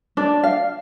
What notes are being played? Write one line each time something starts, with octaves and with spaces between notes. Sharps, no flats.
D4 D5
F5